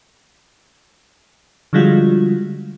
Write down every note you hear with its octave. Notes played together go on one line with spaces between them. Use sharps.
D3 F3 G3 G#3 F4 F#4